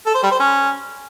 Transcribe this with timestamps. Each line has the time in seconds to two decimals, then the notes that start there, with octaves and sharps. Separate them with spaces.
0.07 A4
0.15 C5
0.23 G3
0.31 C5
0.40 C#4